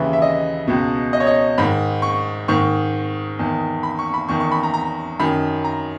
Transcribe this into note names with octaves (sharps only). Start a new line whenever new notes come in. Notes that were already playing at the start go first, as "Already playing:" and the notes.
Already playing: D#2 C#3 E3 E5
E5
D#5
C#2 B2
D#5
C#5
D#5
G#2 D#3 B5
C#6
G#2 D#3 C#6
E2 D#3
B5
C#6
B5
E2 D#3 C#6
C#6
B5
A#5
A#5
F#2 D#3 B5
A#5